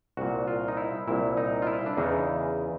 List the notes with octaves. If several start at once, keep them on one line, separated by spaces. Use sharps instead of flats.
C2 A#2 F#4
F4
D#4
E4
C2 A#2 E4
D#4
F4
E4
D4
E2 C#3 E3 D#4